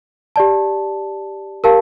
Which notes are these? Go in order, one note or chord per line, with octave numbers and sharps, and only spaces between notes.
G4 D5 A5
G4 A#4 F5 A5